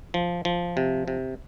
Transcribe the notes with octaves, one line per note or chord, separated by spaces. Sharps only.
F3
F3
C3
C3